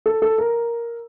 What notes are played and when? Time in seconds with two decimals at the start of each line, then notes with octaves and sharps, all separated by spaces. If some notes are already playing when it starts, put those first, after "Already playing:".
0.06 A4
0.22 A4
0.38 A#4